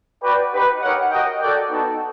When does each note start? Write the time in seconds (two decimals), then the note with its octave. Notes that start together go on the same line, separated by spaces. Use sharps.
0.22 F#4 B4 D5 G5
0.52 D#4 G4 B4
0.80 D#4 G4 A#4 C#5 F#5
1.10 F#4 A#4 D#5 G5
1.39 F#4 A4 D5 G5
1.69 B3 D#4 F#4 A4